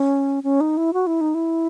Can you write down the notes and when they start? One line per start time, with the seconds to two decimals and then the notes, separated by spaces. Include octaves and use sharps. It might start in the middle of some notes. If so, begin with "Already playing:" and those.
Already playing: C#4
0.43 C#4
0.61 D#4
0.77 E4
0.93 F#4
1.07 E4
1.21 D#4
1.35 E4